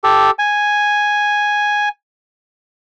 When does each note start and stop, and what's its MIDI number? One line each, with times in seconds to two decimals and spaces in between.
0.04 0.31 67
0.04 0.31 69
0.39 1.89 80